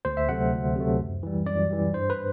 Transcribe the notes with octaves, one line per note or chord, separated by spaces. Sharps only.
D2 C5
E5
C3 F#3 A3 F#5
D2
C3 F#3 A3
F#2
E3 G3
F#2 D5
E3 G3
G2 C5
B4